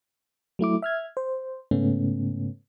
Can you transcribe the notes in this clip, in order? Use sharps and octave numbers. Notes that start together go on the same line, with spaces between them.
F#3 A3 E4 D6
E5 F6 G#6
C5
G#2 C#3 A3 B3 C#4